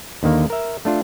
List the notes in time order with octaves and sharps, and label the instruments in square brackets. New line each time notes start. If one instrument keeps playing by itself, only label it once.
[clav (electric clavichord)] D#2 D3 D#3 A#3
A#4 E5
A3 D4 F4